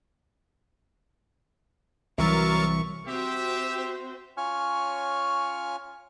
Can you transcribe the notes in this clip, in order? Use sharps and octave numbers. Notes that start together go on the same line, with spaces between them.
C2 E3 F#3 A#4 E5 C#6 A6
C4 F#4 G4 C5 E5
C#4 F4 C#5 G#5 C#6 F6